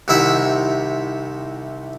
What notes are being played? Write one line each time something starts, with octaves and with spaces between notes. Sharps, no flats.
C2 C3 D#3 E4 E5 F#5